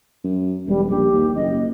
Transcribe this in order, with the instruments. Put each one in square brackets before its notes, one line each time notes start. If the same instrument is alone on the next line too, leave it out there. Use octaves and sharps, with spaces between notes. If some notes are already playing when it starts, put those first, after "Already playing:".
[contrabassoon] F#2
[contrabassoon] E1 [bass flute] G3
[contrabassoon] A#1 [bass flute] G4
[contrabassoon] D#2
[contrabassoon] F#1 [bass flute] D#5